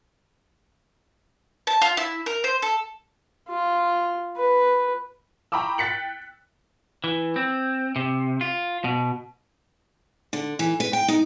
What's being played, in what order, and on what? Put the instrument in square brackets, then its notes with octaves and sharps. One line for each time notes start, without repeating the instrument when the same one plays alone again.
[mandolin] A5
F4
E4
A#4
C5
A4
[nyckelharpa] F4
B4
[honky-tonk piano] G5 A#5 B5 C#6 D6 E6
G5 F#6 A6 B6 C#7 F#7
[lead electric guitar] E3
C4
C3
F4
B2
[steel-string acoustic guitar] D3
E3
B4
G5
D#4